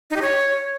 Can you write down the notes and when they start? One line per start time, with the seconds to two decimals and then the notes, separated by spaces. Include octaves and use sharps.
0.10 D#4
0.16 G4
0.22 C#5